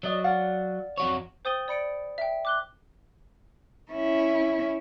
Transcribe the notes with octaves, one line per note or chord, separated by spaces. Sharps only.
F#3 D5 D#5
D5 F5 F#5
F2 F#4 C#5
C5 G5 D#6 A6 D#7 G7
D5 B5 C#7 D7
E5 G5
D6 F#6 G7
C#4 E4